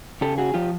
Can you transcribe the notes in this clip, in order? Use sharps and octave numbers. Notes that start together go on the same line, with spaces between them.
C#3 G4 A4
F#4 G#4
F3 F4 G4